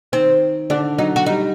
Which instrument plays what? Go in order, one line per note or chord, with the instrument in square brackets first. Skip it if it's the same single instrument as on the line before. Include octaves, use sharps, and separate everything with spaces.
[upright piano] D#3 [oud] C4
[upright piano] D3 [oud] D4
[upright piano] F#3 [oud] D#4
[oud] F#4
[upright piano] G3 [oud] D#4